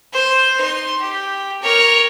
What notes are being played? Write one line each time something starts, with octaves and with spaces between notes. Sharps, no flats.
C5
D#4 C6
G4
A#4 C#5